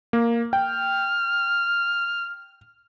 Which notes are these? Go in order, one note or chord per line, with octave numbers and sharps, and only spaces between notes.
A#3
G5 F6